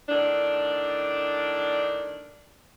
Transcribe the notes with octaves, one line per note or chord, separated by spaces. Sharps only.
A2 D#3 D4